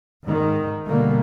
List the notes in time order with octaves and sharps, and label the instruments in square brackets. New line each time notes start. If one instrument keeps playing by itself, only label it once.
[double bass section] G#2 D#3
B2 D3 G3 A3 A#3